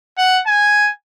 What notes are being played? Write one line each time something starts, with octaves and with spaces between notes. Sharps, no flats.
F#5
G#5